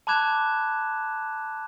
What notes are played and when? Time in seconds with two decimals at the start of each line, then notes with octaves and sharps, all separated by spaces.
0.07 A5 B5 D6 F#6 G#6 E7